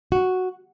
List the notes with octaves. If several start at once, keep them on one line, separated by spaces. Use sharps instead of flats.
F#4